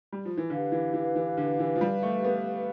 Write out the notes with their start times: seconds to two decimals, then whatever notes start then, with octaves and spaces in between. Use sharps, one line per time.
0.12 G3
0.25 F3
0.38 E3
0.50 D3 G4 B4 F5
0.72 E3
0.94 E3
1.16 E3
1.37 D3
1.59 E3
1.76 F3
1.81 G3
2.03 A3
2.24 B3